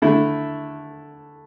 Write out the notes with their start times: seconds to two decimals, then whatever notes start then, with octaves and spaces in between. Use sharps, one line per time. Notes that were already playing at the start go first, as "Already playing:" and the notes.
0.02 D3 A3 E4